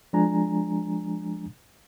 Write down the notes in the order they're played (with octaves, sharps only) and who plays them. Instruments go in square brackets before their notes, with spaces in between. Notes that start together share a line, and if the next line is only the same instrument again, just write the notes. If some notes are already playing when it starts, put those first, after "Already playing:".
[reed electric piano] F3 G#3 D4 G#5 A#5